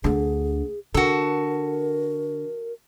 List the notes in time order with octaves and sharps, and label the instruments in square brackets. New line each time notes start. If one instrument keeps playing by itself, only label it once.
[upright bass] D2 D3 [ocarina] G#4
[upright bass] D3 [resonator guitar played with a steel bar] F#4 A4 [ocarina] A#4